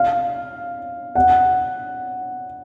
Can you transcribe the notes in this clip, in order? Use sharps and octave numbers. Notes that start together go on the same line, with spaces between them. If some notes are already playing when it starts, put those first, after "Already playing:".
Already playing: F5
F#5